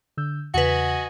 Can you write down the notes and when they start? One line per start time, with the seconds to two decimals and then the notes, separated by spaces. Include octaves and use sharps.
0.17 D3 E6 G6
0.54 E2 C#3 F#4 B4 D#5 F#5 G#5